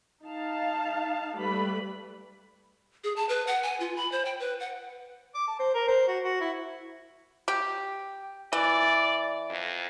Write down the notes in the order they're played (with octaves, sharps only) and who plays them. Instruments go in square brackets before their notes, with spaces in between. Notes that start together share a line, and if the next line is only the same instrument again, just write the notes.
[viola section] D#4 F5 A5
G3 A3 B4 B5
[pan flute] G#4
A5
B4
F#5
G#5
F4
B5
C5
G5
B4
F#5
[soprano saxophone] D6
A5
C5
A#4
C5
F#4
F#4
E4
[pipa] G4
[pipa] E3 [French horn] D5
[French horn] F2